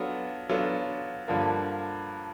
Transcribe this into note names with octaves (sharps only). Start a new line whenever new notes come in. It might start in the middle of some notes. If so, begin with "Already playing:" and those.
Already playing: F#3 B3 D4 F4 A4
F#3 B3 D4 F4 A4
G2 D3 F3 A#3